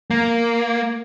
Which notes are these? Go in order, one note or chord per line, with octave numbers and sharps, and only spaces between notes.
A#3